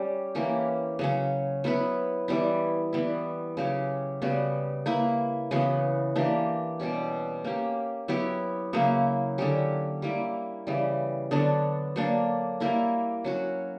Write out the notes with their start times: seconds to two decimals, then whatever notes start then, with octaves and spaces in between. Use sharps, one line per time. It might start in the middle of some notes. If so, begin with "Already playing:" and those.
Already playing: G3 C#4 G4
0.35 E3 A#3 C#4 G4
0.99 C#3 F#3 C#4
1.64 F#3 B3 E4 B4
2.28 E3 G3 B3 E4
2.93 E3 G3 B3 E4
3.57 C#3 F#3 C#4 G4
4.22 C#3 G3 B3 F#4
4.86 A#3 E4 B4
5.51 C#3 E3 B3 F#4
6.16 E3 A#3 D4 G4
6.80 B2 G3 C#4 G4
7.44 A#3 C#4 G4
8.08 F#3 B3 E4 G4
8.73 C#3 F#3 A#3 E4
9.38 D3 F#3 C#4 G4
10.02 G3 A#3 E4
10.67 C#3 E3 G3
11.31 D3 F#3 B3 D4
11.96 F#3 A#3 D4
12.60 G3 A#3 E4 A#4
13.24 F#3 C#4 F#4